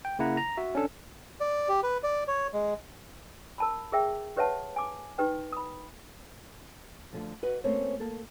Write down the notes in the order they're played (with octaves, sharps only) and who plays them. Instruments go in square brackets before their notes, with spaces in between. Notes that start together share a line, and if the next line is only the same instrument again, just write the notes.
[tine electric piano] G5
C#3 A#3 E4 F#5 A#5
A#5
F#4 E5
C#4 D4 A4
[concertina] D5
G4
B4
D5
C#5
G#3
[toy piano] A#4 A5 B5
G#4 A#4 E5 G5
G4 B4 C#5 E5 F#5 A5
G#5 D6
D#4 G4 B4 G5
B5 D#6
[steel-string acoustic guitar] D2 D3 F3
F#4 B4 D#5 F#5
A3 A#3 C4 C#4 C5 C#5
A#3 A4